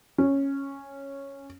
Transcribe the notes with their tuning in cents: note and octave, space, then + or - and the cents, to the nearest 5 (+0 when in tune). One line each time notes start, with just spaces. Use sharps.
C#4 -5